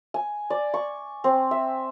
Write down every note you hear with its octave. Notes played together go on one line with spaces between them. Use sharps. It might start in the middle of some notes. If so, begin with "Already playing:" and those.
G#5
D5
C#6
C4
E5